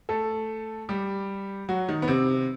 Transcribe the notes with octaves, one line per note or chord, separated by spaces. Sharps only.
A3 A4
G3 G4
F#3 F#4
D#3 D#4
B3
C3 C4